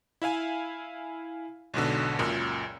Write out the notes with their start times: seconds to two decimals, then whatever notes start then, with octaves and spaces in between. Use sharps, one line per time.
0.22 E4 E5 F5 G#5
1.74 B1 G#2 B2 D3
2.19 C#2 F#2 A#2